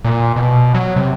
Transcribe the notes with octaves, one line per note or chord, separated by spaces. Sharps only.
A#2
B2
F#3
C3